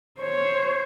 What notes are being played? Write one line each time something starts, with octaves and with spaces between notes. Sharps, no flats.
C5 C#5